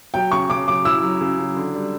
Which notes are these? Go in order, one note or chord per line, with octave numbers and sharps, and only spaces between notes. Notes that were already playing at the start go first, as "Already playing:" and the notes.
F#3 G5
C#3 C#6
C#3 D6
F#3 D6
E4 E6
F#3
C#3
F#3
D3
G3